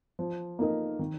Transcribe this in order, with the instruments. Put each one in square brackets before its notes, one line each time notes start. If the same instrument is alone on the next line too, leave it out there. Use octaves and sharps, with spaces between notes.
[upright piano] F3
A#3 D#4 A#4 D#5
D#3